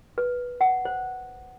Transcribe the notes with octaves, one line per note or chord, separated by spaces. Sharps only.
B4
F#5
C5